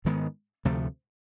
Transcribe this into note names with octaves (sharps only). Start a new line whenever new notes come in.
G#2 D#3 G#3 B3
D2 C3 F3 A3